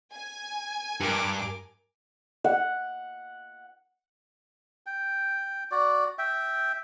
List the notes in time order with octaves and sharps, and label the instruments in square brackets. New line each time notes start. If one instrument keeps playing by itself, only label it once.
[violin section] G#5
[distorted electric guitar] G2 [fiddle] A#4 D6
[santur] F#5
[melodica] G5
F#4 D5
E5 G5